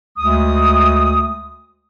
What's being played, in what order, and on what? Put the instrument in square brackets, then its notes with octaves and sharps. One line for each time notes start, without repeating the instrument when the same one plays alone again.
[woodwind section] D2 G#3 D#6